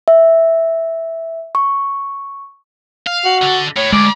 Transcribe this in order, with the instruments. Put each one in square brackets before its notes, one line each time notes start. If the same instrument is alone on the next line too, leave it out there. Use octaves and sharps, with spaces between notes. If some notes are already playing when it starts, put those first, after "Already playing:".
[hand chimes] E5
C#6
[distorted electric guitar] F5
[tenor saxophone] F#4
[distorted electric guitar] D3 A4
[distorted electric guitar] A2 [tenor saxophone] C#5
[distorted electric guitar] D2 [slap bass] G#3 [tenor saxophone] D5